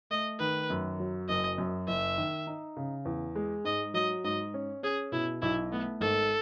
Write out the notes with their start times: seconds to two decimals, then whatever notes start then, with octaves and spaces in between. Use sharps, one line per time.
0.11 A3 D#5
0.39 D#3 B4
0.70 F#2
1.00 F#3
1.29 F#1 D#5
1.58 F#2
1.88 F#1 E5
2.18 D#3
2.47 D#4
2.77 C#3
3.05 E2
3.36 G#3
3.64 G#2 D#5
3.94 F#3 D#5
4.24 G#2 D#5
4.54 C#4
4.83 C#4 G#4
5.12 B2 E4
5.42 B1 E4
5.71 A3 B3
6.01 G#1 A4